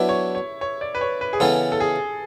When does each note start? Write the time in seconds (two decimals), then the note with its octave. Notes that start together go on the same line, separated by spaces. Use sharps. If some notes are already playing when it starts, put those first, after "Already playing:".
Already playing: F#3 B3 D4 E4
0.09 C#5
0.35 C#5
0.61 C#5
0.81 D5
0.95 B4
1.01 C#5
1.21 B4
1.33 G#4
1.40 C#3 E3 B3 A4
1.72 A4
1.80 G#4